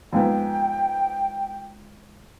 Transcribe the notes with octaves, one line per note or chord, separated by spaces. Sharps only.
F2 G#2 B3 G5